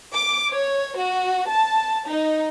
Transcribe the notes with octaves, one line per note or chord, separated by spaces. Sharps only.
D6
C#5
F#4
A5
D#4